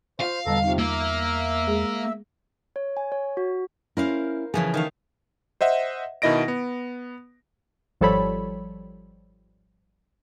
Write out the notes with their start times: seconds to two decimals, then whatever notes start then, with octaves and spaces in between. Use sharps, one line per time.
0.20 F4 C5 F5
0.46 E2 B2 D3 G3 A4 D#5 A#5
0.64 C3 D#4 F4
0.78 A#3 E5
1.67 G#3 G#4
2.76 C#5
2.97 G#5
3.12 C#5
3.37 F#4
3.97 C#4 E4 A#4 C5 F5
4.54 C#3 E3 F3 G#4 G#5
4.74 D#3 A3 F5
5.61 C5 D#5 E5 F#5
6.22 B2 D#3 E4 D#5 A#6 D7
6.48 B3
8.01 G#1 F3 G3 A4 C#5 B5